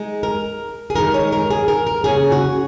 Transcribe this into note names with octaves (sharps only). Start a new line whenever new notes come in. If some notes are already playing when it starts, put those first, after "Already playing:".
Already playing: G#3 D#4
A#4
G#4
D#3 G#3 D#4 A#4
C#5
A#4
G#4
A#4
A#4
C#3 A#3 C#4 G#4
F#4